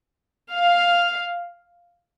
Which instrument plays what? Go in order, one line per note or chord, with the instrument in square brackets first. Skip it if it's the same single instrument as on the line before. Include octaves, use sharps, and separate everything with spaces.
[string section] F5